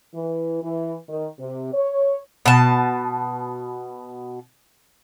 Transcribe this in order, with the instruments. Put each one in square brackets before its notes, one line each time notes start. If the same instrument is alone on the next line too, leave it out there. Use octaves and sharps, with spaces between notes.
[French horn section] E3
E3
D#3
C3
C#5
[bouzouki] B2 A5